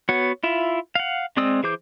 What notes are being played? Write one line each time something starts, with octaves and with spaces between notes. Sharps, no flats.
B3 F#4 C#5
E4 F4 E5
F5 F#5
G#3 C4 D5 D#6 E6
E3 G#4 C5 D6 G6